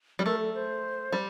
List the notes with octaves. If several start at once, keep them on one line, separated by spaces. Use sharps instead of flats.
G3
A3 A#4
A4
C5
G3